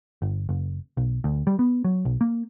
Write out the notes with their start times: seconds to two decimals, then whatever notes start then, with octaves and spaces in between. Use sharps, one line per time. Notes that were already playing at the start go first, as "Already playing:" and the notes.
0.22 G1
0.49 F#1
0.97 B1
1.24 D2
1.47 G3
1.59 B3
1.84 F#3
2.05 B1
2.21 A#3